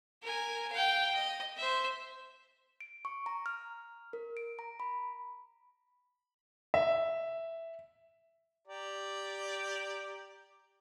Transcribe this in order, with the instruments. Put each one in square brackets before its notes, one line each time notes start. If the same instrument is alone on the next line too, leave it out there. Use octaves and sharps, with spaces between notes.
[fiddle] A#4 G#5
F5 G5
D#5
C5 E5
[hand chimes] D7
C#6
A#5
F6
A#4
D7
A#5
B5
[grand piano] E5
[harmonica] G4 D5 A#5